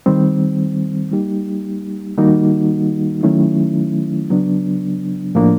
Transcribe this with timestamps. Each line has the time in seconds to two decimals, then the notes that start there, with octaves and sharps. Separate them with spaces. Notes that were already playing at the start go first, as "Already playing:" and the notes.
0.06 D#3 G3 C4
1.12 G3 A#3 D#4 G4
2.18 D#3 G3 A#3 D#4 F#4
3.23 D#3 F#3 A3 C#4 E4
4.30 C#3 F#3 B3 D4
5.35 A2 F3 A#3 D4